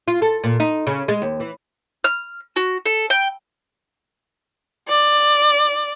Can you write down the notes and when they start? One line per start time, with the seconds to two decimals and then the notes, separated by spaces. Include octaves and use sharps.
0.08 F4
0.22 A4
0.44 A#2
0.60 D#4
0.87 C#3
1.08 G#3
1.22 D#2
1.40 E3
2.04 F6
2.56 F#4
2.86 A4
3.10 G5
4.89 D5